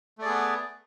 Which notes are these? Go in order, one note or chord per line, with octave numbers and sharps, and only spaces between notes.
A3 B3 G#4 D5